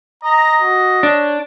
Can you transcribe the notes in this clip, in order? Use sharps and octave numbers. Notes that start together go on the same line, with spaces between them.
D#5 A#5
F#4
D4 C#5